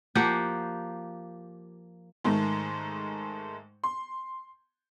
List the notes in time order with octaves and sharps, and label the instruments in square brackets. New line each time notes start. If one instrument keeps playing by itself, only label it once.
[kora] F3 A#3 G4 F#5
[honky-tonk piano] G#2 D#3 G#3 A3
C6